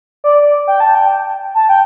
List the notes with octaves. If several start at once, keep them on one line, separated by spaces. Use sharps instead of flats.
D5
G5
A5
G5
A5
G5